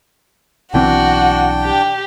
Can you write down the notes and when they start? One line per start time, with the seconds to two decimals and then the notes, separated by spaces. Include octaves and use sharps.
0.74 B1 E3 C4 D4 F#4 G5
1.63 G4